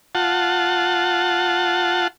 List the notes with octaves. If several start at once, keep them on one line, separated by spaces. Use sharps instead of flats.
F4 F#5 A5